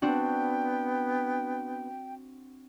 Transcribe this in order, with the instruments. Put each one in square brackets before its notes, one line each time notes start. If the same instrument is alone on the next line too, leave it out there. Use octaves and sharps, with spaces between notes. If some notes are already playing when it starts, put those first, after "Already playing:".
[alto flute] B3 [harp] C4 D4 F#4 [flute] G5